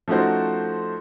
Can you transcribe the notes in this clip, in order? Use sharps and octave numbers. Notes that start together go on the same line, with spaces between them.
F3 A3 C#4 D#4 F#4 C5